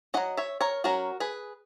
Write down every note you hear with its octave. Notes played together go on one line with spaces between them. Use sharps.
F#3 C#4 D#5 F#5
C#5 E5
A#4 C#5
F#3 C#4 F#4 A#4
G#4 B4